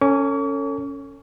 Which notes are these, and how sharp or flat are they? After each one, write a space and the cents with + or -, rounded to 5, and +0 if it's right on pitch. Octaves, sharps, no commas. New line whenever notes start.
C#4 +0 A4 +35 C#6 +45